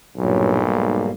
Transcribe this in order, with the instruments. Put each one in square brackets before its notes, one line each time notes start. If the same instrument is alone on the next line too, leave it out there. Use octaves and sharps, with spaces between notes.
[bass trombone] B1 [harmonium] G2 A#2 F#3
[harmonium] G#2 G3 A#3